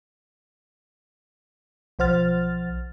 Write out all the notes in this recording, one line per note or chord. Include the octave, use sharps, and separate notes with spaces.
B1 F3 C5 F#5 F6 A6